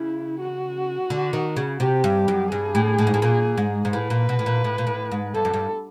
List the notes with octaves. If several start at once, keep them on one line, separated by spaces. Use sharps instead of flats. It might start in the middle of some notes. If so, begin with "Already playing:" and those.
Already playing: C#3 E4
F#4
D3
D#3
C#3
C3 G4
G2
F#2
G2 G#4
A2
A2
G#2
A2
A#2
G#2
G#2
A2 B4
A#2
B2
A2
A#2
A2
A#2
A2
G#2
G2 A4
F#2
G2